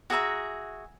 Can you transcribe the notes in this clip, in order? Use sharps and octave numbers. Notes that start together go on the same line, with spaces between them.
F#4 G#4 E5 A#5